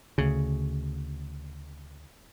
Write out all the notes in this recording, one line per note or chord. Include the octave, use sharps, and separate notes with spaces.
D2 C#3